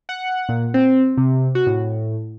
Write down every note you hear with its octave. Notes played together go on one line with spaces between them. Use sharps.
F#5
A#2
C4
C3
F#4
A2